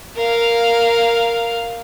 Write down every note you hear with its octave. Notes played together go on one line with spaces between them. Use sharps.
A#4 F5